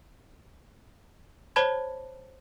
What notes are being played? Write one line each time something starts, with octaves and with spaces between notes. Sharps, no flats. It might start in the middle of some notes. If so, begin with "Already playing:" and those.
C5 C#5 A5 B5 G#6